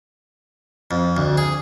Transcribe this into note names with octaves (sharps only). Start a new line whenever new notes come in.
F2
D2
G#4